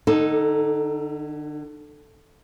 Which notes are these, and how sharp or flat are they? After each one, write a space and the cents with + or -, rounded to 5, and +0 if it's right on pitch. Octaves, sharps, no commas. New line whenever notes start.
D3 +35 D#4 +0 A4 +0